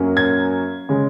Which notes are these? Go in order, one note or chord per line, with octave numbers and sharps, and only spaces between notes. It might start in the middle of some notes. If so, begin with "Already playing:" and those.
Already playing: F#2 F#3 A#3 C#4
G#6
C#3 G#3